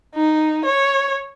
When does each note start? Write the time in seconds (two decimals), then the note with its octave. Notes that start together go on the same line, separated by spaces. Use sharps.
0.15 D#4
0.65 C#5